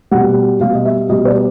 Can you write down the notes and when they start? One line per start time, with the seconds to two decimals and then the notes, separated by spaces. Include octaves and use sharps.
0.11 B2 G3 F#5
0.60 B2 G3 F5
0.75 D#5
0.85 E5
1.09 B2 G3 D#5
1.25 D5